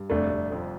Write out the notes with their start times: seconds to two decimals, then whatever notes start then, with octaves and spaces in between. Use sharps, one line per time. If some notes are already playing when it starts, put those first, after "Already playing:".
Already playing: G2
0.10 F1 A3 D4
0.31 F1
0.52 F2